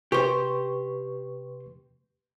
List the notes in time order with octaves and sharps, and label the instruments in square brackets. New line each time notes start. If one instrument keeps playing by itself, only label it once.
[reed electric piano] C3 B4 C#6 [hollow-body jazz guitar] G4 C5